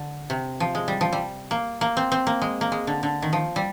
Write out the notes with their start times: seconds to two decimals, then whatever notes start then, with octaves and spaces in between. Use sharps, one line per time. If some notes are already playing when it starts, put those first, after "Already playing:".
Already playing: D3
0.30 C3
0.60 F3
0.75 G#3
0.88 G3
1.01 F3
1.13 G3
1.51 A#3
1.81 A#3
1.97 C4
2.12 C4
2.27 A#3
2.42 G#3
2.61 A#3
2.72 G#3
2.87 D3
3.03 D3
3.22 D#3
3.33 F3
3.56 G3